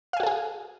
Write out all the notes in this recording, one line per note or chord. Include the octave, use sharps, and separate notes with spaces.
F#4 G#4 A4 F5 G#5